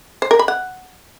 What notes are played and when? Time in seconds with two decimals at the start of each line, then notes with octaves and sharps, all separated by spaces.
0.22 C5
0.31 A#4
0.39 B5
0.48 F#5